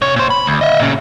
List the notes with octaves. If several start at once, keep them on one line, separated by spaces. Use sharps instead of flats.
C3 C#5
A#2 C5
B5
D2
D#5 E5
A#2 C#3